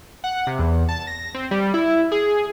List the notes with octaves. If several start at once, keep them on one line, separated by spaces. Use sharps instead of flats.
F#5
C3
E2
A5
A#6
C4
G3
E4
G#4